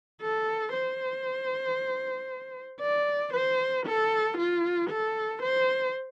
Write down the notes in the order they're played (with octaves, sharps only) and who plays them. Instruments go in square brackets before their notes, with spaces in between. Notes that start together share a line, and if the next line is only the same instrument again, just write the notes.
[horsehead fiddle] A4
C5
D5
C5
A4
F4
A4
C5